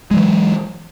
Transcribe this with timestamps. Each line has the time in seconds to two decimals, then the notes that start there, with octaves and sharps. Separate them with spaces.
0.11 G#3
0.14 F#3
0.17 E3